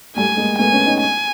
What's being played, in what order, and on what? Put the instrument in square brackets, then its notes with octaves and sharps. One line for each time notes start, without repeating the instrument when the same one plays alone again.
[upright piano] G3 A3 [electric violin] G#5
[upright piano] G#3 A#3
[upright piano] A3 B3 [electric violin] G#5
[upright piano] B3 C#4
C#4 D#4
[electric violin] G#5